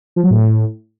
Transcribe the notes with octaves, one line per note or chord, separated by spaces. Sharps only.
F3
F#3
A2